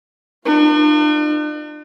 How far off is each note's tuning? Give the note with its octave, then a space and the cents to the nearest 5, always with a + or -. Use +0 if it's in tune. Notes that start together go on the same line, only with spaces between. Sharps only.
D4 +45 F4 -25